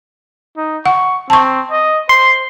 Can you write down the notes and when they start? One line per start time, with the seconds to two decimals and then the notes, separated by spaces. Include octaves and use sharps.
0.57 D#4
0.86 F#5 C#6
1.30 C4 A5 C#6
1.71 D#5
2.09 C5 C6